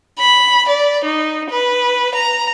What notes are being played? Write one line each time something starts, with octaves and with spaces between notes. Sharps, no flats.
B5
D5
D#4
B4
A#5